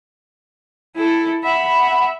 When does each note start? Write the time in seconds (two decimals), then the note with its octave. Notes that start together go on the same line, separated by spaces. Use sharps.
0.96 E4 A4
1.44 E5 F#5 B5